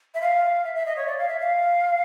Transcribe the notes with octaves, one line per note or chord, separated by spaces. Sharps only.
E5
F5
E5
E5
D#5
C#5
D5
F5
E5
F5